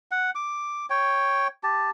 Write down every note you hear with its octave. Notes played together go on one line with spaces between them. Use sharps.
F#5
D6
C#5 G5
G4 A5